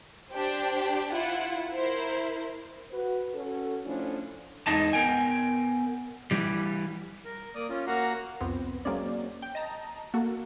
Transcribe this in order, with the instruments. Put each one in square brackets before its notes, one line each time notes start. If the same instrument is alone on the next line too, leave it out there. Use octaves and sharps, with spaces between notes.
[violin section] D4 G4 C5
E4 F4 F#5
E4 A#4 C5
[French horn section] F#4 B4
C#4 F#4 A4
F3 A3 C#4 D4 E4
[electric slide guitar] E2 G#3 D#4 A5
B3 A#4 G5 G#5
E3 G3
[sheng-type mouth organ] A#4
A#3 D5 D#6
C#4 F4
A#3 F#4 F5 F#5 A#5
[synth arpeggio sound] C2 F2 B3 C4
F#3 G#3 A#3 C4 C#4 D5
G5
D#5 A5 A#5
A#3 F#4 A4